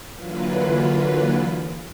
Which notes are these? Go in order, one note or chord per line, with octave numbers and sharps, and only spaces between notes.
D3 E3 F#3 A#3 F4 B4